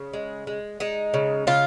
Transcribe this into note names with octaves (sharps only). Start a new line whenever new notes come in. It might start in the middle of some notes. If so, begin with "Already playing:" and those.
Already playing: C#3
G#3
G#3
G#3 D#4
C#3
C#3 F4